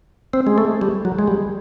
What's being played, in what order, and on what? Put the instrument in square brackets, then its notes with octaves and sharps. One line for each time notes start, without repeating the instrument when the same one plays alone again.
[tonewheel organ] C4
G#3
A3
G3
F#3
G#3
G3